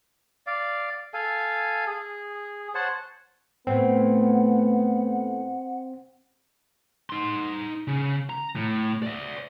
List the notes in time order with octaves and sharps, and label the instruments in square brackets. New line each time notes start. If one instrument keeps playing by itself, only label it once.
[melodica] D5 F5
A4 F5 G#5
G#4
C5 C#5 F#5 A5
[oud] A2 A3 [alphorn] B3 [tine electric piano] C4 [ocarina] F#5
[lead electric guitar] D#4 C6
C#3
A#5
A2
D5 E5